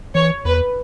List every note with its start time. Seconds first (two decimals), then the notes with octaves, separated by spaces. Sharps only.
0.15 E3 C#5
0.45 E2 B4